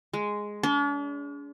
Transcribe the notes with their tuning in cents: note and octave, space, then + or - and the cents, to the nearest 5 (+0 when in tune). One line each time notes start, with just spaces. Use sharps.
G#3 +0
D4 -45